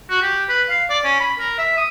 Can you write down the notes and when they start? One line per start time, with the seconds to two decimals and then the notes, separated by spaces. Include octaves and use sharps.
0.10 F#4
0.22 G4
0.49 B4
0.70 F5
0.90 D5
1.04 C#4
1.20 B5
1.39 A#4
1.58 E5
1.77 D#6